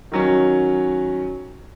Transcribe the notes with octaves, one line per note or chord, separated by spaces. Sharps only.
D#3 F#3 C#4